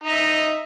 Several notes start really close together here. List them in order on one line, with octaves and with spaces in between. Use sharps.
D#4 D#5 E5